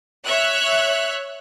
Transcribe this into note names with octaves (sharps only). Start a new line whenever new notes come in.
C#5 E5 F#6